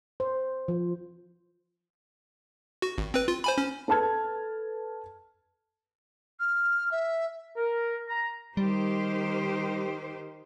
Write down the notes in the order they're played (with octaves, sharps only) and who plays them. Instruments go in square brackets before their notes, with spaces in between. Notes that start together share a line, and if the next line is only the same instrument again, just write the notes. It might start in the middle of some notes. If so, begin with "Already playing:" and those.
[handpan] C5
F3
[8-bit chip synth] F#4
G#1
C4 B4
F4
C5 G#5 B5
C#4
[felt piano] A4 B4 A5 F6 G#6
[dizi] F6
E5
[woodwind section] A#4
A#5
[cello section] D#3 G4 C5 [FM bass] G3